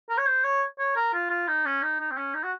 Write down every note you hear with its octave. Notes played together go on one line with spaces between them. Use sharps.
A#4
C#5
C5
C#5
C#5
A#4
F4
F4
D#4
C#4
D#4
D#4
C4
C#4
D#4
F#4